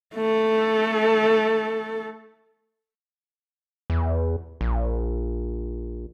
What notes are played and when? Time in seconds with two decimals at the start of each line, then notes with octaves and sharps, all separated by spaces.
0.15 A3 A4
3.90 E2
4.61 A#1